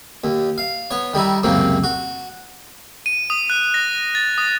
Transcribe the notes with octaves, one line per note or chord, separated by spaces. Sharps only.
D#2
F5
B3 C#5
D#3 G3 D#4 E4
C#2 F#2 C3 A#3 C4
F#4
D#7
D#6
F#6
A#6
A6
D#6